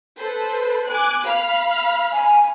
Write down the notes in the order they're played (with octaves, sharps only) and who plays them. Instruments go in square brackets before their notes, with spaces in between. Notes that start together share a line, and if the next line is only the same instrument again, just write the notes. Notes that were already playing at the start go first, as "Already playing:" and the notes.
[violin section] A4 B4 C5
G#5 D6 F#6
F5 B5 F6
[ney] G#5